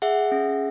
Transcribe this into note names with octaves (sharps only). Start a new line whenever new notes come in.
G#4 E5 F#5
C#4